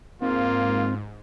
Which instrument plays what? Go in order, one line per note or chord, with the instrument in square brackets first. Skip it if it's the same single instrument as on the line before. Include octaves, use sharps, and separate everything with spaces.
[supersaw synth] G#2 [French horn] A#3 [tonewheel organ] C4 [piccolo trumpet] F4